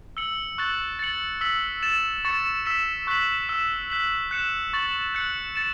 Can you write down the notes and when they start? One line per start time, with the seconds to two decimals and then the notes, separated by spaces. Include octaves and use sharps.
0.17 E6 C#7 F#7
0.58 C#6 F#6 A6 F#7
0.99 A6 C#7 F#7
1.41 E6 B6 F#7
1.83 A6 E7
2.25 C#6 A6 C#7
2.66 E6 B6 E7
3.07 C#6 F#6 B6 F#7
3.49 E6 B6 E7
3.90 F#6 B6 F#7
4.31 F#6 C#7 E7
4.73 C#6 A6 F#7
5.15 F#6 C#7 F#7
5.56 A6 C#7 E7